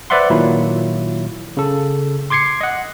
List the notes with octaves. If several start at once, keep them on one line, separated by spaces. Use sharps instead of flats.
B4 C5 D5 E5 F#5 C6
A#2 D#3 F#3 E4 F4
C#3 A4
C6 D6 G#6 C7 C#7
D#5 F#5